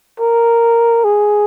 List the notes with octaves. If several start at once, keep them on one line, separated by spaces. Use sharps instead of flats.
A#4
G#4